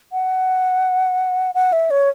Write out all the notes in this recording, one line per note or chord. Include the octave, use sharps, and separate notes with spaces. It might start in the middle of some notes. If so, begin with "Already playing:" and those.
F#5
F#5
E5
C#5